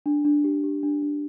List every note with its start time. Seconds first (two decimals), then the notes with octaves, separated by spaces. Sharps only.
0.06 D4
0.25 D4
0.44 G4
0.64 G4
0.83 D4
1.02 D4